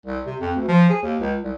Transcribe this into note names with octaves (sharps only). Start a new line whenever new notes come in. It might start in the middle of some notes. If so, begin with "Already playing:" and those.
C2
C3
F2
D2
F3
G#4
D#2
C#2
C2